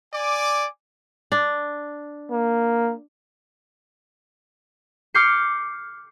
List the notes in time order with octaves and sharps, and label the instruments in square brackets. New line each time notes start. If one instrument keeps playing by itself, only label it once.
[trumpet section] D5 G#5 D6
[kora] D4
[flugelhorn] A#3
[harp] D6 F6 G6 C7 C#7